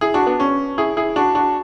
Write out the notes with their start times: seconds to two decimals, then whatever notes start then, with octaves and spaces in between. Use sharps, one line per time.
0.01 E4 G#4
0.14 D4 F#4
0.26 B3 D4
0.40 C#4
0.78 E4 G#4
0.97 E4 G#4
1.16 D4 F#4
1.35 D4 F#4